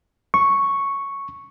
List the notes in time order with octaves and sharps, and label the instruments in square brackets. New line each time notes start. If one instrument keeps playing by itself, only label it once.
[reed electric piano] C#6